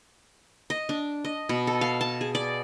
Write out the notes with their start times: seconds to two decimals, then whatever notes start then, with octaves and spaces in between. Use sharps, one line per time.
0.70 D#5
0.89 D4
1.25 D#5
1.49 B2
1.67 A4
1.81 F5
2.01 A5
2.21 G#4
2.35 D5